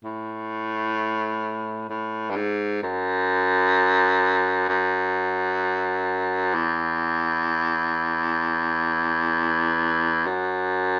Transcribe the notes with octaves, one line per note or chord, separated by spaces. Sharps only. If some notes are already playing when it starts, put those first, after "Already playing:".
A2
A2
G2
G#2
F#2
F#2
E2
F#2